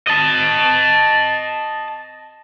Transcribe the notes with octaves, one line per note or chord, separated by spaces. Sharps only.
D#5 A5